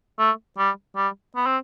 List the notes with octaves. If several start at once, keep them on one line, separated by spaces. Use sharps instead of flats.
A3
G3
G3
B3
C4